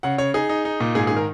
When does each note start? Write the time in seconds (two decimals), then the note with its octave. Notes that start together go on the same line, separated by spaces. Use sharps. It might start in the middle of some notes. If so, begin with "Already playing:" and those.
0.03 C#3 F#5
0.18 C#3 C#5
0.34 D#4 G#4
0.49 D#4
0.65 D#4
0.80 A#2
0.95 G#2 G#4
1.07 D#3 G#4
1.16 A#4